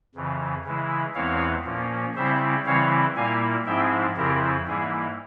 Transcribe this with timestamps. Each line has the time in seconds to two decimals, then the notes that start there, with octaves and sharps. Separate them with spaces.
0.15 F2 C#3 E3
0.65 C#3 E3 G#3 E4
1.14 E2 E3 G#3 C4 E4 C#5 F5
1.65 A#2 F3 A#3 C#4
2.15 C#3 G3 C4 E4 C5 E5
2.66 C#3 E3 G3 C4 E4 C#5 F5
3.16 A#2 G3 A#3 E4 F5 G#5
3.66 G#2 F3 G#3 C4 E4 E5 G5
4.16 F2 C#3 F3 C4 E4 G4 A#4
4.67 G#2 E3 G3 A#3 E4 G#4